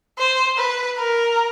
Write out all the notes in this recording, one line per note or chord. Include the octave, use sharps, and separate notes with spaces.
C5
B4
A#4